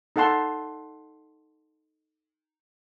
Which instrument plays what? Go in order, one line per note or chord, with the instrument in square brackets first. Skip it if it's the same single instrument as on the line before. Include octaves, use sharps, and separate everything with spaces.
[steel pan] D#4 A4 F#5 A5 C6